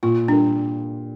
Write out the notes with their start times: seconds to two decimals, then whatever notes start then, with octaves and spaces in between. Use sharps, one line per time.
0.03 A#2 F4
0.28 G3 A#3 D4